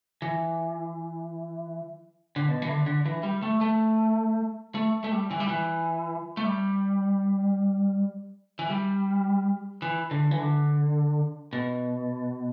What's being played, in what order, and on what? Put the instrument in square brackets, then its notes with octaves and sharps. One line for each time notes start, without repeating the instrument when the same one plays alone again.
[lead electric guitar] E3
D3
B2
E3
D3
D3
E3
G3
A3
A3
A3
A3
G3
E3
G3
E3
A3
G3
E3
G3
E3
D3
E3
D3
B2